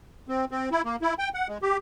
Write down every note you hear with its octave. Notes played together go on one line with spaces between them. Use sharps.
C4
C4
E4
A#3
E4
G5
F#5
G#3
G4